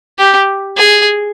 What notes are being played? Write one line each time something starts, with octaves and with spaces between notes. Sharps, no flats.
G4
G#4